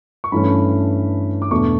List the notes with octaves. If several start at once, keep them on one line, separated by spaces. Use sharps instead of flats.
C#6
G2 E3 A3 C#4 B5
D6
E2 B2 A3 D4 C#6